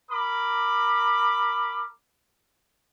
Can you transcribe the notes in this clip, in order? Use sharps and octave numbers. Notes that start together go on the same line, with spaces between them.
A#4 B5 D6